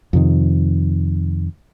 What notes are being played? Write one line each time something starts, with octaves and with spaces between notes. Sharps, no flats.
F2 C3 D#3